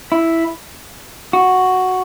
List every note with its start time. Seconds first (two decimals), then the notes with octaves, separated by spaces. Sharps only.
0.12 E4
1.33 F#4